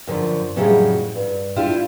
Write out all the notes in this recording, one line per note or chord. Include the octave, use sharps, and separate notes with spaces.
F#2 D3 F3
F2 A2 C#3 F#3 G3 A3
G2
G3 D4 E4 F4 G4